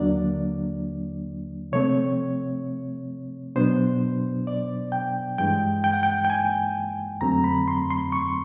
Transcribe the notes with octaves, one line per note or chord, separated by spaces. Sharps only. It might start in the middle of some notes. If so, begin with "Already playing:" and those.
Already playing: D#2 D3 F#3 A#3 D4 D5
C3 F3 A3 C4 C#5
B2 F#3 B3 D4 C5
D5
G5
G2 E3 G#3 G5
G5
F#5
G5
G5
G#5
F2 D3 F#3 A3 C4 A#5
B5
C6
C6
C#6